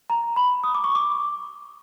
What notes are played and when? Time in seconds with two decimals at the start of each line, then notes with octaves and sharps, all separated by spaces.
0.10 A#5
0.36 B5
0.64 D#6
0.75 D6
0.84 C#6
0.95 D6